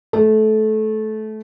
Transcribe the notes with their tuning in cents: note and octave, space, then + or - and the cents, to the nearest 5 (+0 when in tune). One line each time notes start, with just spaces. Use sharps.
A3 -20